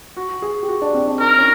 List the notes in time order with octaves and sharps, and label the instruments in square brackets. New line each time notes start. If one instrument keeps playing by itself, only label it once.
[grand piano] F#4
G#4
G4
F#4
D4
C4
D4
[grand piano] D#4 [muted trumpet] A#4
[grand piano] C#4